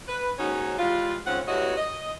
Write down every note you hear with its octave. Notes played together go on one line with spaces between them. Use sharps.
B4
D#2 G#2 C#4 D#4 F#4 C#5
E3 G3 G#3 F4
G#2 C#3 C4 C#4 F4 F#5
D2 G2 E4 F#4 C#5 D#5
D#5